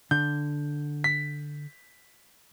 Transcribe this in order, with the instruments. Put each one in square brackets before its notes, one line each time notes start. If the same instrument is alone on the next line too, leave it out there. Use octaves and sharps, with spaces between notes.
[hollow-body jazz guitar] D3 [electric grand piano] G6
[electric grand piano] B6